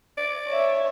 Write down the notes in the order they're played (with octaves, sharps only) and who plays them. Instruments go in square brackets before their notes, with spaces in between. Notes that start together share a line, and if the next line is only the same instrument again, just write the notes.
[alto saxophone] D5
[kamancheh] C#5 E5